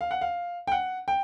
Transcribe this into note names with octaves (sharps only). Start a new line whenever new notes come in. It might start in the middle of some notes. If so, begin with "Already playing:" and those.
F5
F#5
F5
G5
F#5
G5